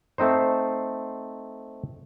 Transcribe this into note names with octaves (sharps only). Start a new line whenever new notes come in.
A3 C4 D#4 C5